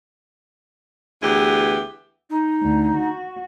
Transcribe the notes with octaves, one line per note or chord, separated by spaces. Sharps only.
D2 E3 B3 G4 G#4
D#4
D2
F#4